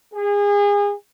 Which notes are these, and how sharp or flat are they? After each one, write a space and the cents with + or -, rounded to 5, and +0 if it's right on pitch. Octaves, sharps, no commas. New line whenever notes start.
G#4 -30